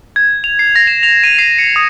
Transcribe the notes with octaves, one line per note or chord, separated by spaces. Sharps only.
G#6
F7
C7
A#6
E7
F7
D#7
C7
C#7
D#6